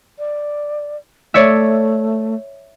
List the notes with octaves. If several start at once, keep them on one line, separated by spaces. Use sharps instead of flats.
D5
A3 C#5 D5 E5